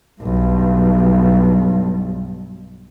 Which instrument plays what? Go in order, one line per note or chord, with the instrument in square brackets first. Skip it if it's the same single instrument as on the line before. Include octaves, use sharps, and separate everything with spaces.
[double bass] B1 G2